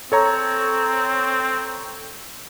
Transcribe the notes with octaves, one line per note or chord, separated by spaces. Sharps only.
C4 A4 C#5 A#5